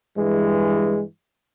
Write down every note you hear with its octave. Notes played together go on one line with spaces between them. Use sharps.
G2 E3 G#3